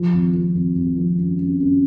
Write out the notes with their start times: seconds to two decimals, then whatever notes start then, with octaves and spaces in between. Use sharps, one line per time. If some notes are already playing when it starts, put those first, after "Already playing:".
Already playing: F3
0.13 G#1
0.33 F3
0.54 G#1
0.75 G#1
0.96 F3
1.18 F#2
1.39 F#2
1.60 F#2